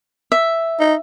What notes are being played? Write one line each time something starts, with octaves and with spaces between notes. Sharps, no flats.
E5
D#4